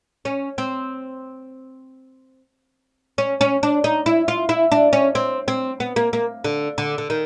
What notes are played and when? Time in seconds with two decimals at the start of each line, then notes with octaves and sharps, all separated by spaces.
0.25 C#4
0.58 C4
3.18 C#4
3.41 C#4
3.63 D4
3.84 D#4
4.06 E4
4.28 F4
4.49 E4
4.72 D4
4.93 C#4
5.15 C4
5.48 C4
5.80 B3
5.96 A#3
6.13 A#3
6.44 D3
6.78 D3
6.98 D3
7.10 D#3